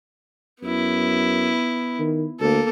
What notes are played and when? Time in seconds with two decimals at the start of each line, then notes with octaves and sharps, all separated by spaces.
0.63 F#2 B3 E4
1.99 D#3
2.40 D2 A#3 A4